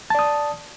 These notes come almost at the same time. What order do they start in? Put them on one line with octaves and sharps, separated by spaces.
A5 D5 D#6